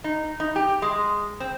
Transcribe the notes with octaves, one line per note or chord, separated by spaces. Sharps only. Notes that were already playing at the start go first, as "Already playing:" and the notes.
D#4
D#4
G4
G#3
C4